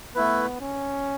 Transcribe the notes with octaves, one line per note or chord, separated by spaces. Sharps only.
A3 B3 E4 B4
C#4